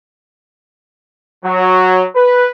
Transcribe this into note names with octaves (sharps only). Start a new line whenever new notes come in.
F#3
B4